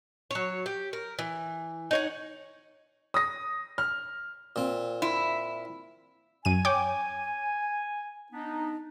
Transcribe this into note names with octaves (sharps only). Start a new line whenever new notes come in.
F#3 C#5
G4
A#4
E3
D#4 C#5 F#5
D#6 A#6
F6
A#2 C4
E4
F#2 G#5 D#7
C#5 G5 D6
B3 D4 D#4